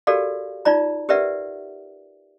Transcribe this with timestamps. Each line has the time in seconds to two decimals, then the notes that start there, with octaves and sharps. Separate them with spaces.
0.07 F#4 G4 A4 A#4 D5 F5
0.65 D#4 F4 D5 A#5
1.09 G4 A#4 B4 D5 E5 F#5